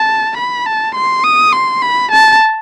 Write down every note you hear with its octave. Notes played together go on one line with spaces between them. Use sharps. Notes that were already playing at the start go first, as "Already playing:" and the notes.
Already playing: A5
B5
A5
C6
D#6
C6
B5
A5